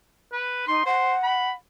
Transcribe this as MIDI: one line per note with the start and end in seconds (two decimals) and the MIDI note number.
0.33 0.67 71
0.67 0.83 63
0.67 0.82 84
0.86 1.13 72
0.86 1.50 78
1.23 1.50 83